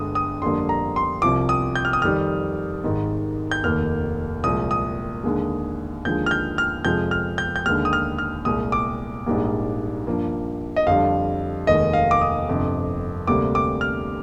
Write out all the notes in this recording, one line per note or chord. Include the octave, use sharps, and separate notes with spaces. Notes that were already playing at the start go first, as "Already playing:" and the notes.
Already playing: G1 G2 D3 G#3 D#6
D#6
F2 D3 G3 A#3 C6
A#5
C6
C2 C3 F3 D6
D#6
G6
F6
D#6
F2 D#3 G3 F6
G#1 G#2 D#3
G6
F1 D#2 D#3 A#3 F6
C2 A#2 F3 G#3 D#6
D#6
D#2 D3 G#3
D#2 D3 F3 G#3 G6
F6
G6
F6
F2 C3 F3 G#3 G6
F6
G6
G6
D#2 D3 G#3 F6
D#6
F6
F6
C2 A#2 G#3 D#6
D6
A#1 G#2 G3 A#3
G2 F3 A#3
D#5
F2 D3 G3 F5
F1 D#2 D#3 G#3 D#5
F5
D6
D#6
G1 F2 C3
D2 C3 G3 A#3 D6
D6
F6